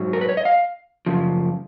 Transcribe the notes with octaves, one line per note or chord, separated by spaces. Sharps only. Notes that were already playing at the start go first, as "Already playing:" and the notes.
Already playing: G#2 F#3
A#4
B4
C#5
D#5
F5
F#2 C#3 F3